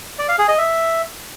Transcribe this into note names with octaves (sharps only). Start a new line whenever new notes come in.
D5
F5
G#4
D#5
E5